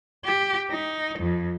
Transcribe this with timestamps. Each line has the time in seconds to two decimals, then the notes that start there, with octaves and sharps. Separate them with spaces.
0.24 G4
0.70 D#4
1.19 F2